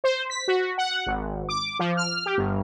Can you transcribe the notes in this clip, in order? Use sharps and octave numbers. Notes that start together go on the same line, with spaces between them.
C5
B6
F#4
F#5
G#1
D6
F3
F6
G4
G1